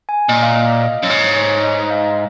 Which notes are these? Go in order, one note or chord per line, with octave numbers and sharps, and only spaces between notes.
G#5
A#2 D#5
F5
D#5
F5
D#5
F#2
G#2 C#5
C#5
D#5
F5